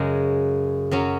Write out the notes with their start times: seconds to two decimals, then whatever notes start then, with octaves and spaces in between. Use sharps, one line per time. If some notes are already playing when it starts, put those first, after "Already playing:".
Already playing: F#2 C#3 G#3
0.91 F#2 F#3 C#4